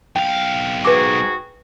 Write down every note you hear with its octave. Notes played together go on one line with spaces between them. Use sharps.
B1 F5 G5
G#2 F#4 G#4 B4 D6